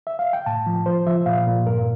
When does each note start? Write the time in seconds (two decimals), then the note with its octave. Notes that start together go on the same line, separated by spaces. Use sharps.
0.07 E5
0.19 F5
0.33 G5
0.46 A2 A5
0.66 F3
0.86 F3 C5
1.07 F3 E5
1.26 A#2 F5
1.47 A#2
1.67 G2 A#4